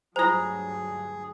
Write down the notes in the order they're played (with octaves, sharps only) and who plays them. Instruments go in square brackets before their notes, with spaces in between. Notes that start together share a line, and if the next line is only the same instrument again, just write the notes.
[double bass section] D2 G2 F#3 [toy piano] F4 C5 [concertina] G#4 [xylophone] A#5 D#6